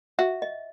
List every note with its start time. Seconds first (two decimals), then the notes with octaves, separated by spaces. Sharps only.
0.19 F#4 E5
0.42 D#5